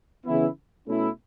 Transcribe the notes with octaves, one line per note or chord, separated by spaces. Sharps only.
C#3 E3 B3 E4
B2 A3 C#4 E4